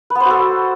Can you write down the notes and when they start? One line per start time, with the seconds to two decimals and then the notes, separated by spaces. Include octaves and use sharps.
0.10 B4
0.15 B3
0.20 C5
0.25 F#4
0.30 A4